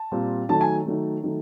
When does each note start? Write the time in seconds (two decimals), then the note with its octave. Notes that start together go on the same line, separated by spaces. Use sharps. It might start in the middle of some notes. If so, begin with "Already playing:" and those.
Already playing: A5
0.12 A#2 G3 C4
0.49 D#3 F#3 A3 A5
0.61 G#5
0.85 D#3 F#3 A3
1.23 D#3 F#3 A3